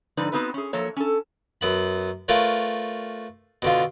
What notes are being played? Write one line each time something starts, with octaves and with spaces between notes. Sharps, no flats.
G#2 D3 F3 D#4 B4 D5
B3 C4 D#4 F#4 B4
C#4 G#4
F3 F#3 A#3 A4 C#5
C#4 A4
F#2 B3 B5
A3 F4 A#4 B4 C#5
B2 D3 F4